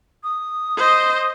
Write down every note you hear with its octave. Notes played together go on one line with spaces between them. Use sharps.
D#6
C5 D#5